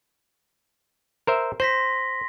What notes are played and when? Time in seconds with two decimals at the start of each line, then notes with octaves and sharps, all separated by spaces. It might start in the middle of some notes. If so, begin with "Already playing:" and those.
1.27 A#4 C5 E5
1.60 C5 C6 A#6 B6